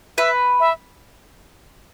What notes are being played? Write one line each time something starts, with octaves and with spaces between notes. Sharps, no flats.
B4 E5
E5